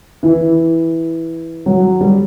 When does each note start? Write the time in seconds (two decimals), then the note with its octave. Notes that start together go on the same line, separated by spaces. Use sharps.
0.23 E3
1.66 F#3
2.01 G3